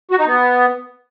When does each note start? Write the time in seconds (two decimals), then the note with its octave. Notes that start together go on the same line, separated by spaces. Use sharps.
0.11 F#4
0.19 D#4
0.27 B3